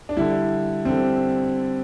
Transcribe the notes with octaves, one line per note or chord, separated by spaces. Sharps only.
D4
D3 G3 E4
D3 G3 C4